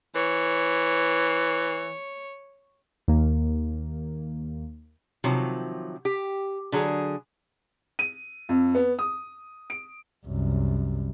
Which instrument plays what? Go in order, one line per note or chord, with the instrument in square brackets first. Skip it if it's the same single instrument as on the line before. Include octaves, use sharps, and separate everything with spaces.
[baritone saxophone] E3 [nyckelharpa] C#5
[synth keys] D#2 A#3
[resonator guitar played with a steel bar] C3 D#3 F3 F#3
G4
D3 F#3 G#4
[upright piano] D#7
F2
B3
D#6
D7
[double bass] C2 F#2